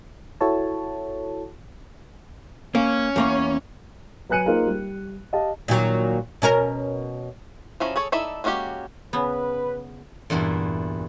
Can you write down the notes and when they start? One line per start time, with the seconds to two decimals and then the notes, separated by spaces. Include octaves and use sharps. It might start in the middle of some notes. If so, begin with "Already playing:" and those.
0.41 E4 F#4 A4 C#5 A5
2.75 A#3 C#4
3.16 E2 A#3 C#5
4.29 F#3 B4 G#5 F#6 C#7 D#7
4.46 A#3 D#4 F4 G#4 A#4 C5
4.67 G3
5.33 G4 D#5 F5 A5
5.68 A#2 D#3 F#3
6.42 B2 C#4 A#4
7.80 F3 F#3 C#4 E4
7.96 G#4 A4 C#5
8.12 D#4 E4 A4 D5 E5
8.44 G#3 A#3 C#4 F#4 G4
9.13 C#3 B3 B4
10.30 E2 G2 A#2 E4